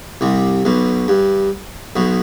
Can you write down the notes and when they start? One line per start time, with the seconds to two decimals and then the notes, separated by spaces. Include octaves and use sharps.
0.21 C2 C3
0.65 B1 B2
1.08 G2
1.96 B1 B2